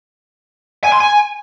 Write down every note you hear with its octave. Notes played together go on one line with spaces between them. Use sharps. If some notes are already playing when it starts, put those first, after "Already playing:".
G#5
C6
G#5